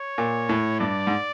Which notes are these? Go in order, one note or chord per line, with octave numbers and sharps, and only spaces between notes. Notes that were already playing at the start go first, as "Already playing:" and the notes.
Already playing: C#5
A#2
A2
G2 D5
G#2